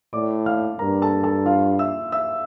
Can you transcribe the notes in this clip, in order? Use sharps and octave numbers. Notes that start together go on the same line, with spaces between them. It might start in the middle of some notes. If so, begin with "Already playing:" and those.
A2 D5 D6
F5 F6
G2 A#4 A#5
A4 A5
A4 A5
F4 F5
E5 E6
E5 E6